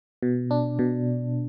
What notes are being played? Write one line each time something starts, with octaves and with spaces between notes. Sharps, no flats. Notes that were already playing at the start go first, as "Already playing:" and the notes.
B2
D4
B2